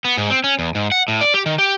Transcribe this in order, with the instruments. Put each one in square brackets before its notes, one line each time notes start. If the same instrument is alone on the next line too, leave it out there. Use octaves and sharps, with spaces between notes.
[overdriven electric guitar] B3
G#2
C4
C#4
E2
G#2
F#5
A2
D5
G4
D#3
G4